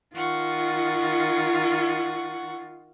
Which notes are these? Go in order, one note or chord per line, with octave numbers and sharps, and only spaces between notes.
D#3 F4 F#5 C#6